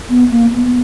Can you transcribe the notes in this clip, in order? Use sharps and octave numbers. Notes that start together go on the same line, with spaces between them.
B3
A#3
B3